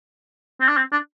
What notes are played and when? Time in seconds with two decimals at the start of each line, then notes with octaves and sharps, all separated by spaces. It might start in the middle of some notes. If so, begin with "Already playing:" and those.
0.61 C4
0.68 D4
0.77 C4
0.92 D4